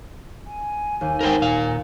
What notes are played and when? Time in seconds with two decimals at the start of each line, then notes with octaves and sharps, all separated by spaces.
0.46 G#5
1.01 D#2
1.21 A#4 C5 G5
1.42 A#2 F5